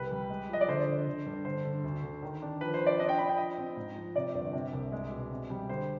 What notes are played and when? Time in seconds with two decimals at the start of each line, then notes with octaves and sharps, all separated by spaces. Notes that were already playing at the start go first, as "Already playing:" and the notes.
Already playing: C2 G3 B4
0.11 G3
0.30 G#3
0.49 F3 D#5
0.61 D5
0.68 D3 C5
0.87 D3
1.07 D3
1.26 G2
1.45 D3 C5
1.65 D3
1.84 D2
2.03 D3
2.23 D#3
2.42 D4
2.61 F3 B4
2.74 C5
2.81 F3
2.86 D5
2.99 D4 D#5
3.09 G5
3.19 D4 B5
3.29 G5
3.37 F3 D#5
3.58 C4
3.76 G#2
3.96 F3
4.16 C3 D5
4.35 G1
4.53 C3
4.73 C2
4.92 G#3
5.11 B2
5.31 C3
5.50 G3
5.69 D3 C5